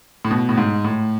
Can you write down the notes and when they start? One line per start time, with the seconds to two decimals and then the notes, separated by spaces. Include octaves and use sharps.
0.25 A2
0.31 B2
0.49 A2
0.57 G#2
0.85 A2